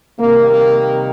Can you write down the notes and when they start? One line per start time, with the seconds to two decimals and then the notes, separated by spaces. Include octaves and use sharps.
0.18 C3 D#3 G3 A#3
0.47 A#3